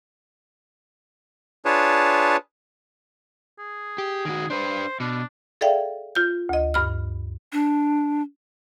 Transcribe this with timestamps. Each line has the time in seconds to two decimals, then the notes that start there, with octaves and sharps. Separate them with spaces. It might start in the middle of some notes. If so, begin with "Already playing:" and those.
1.65 D4 F4 G#4 B4 C#5 A5
3.59 G#4
3.98 G4
4.25 D#3 F#4
4.50 D4 B4 C5
5.00 B2 D4
5.61 G#4 A4 D5 E5 F5 G5
6.15 F4 G6
6.49 D2 D#5
6.74 G2 B5 F6
7.53 D4